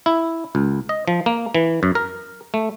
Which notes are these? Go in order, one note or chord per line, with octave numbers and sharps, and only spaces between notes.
E4
C#2
D#5
F3
A#3
E3
F#2
A#4
A3